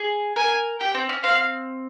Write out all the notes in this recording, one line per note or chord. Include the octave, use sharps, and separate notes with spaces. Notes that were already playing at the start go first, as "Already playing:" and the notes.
Already playing: G#4
A#4 G#5
G4 G5
C4
C#4
C4 F5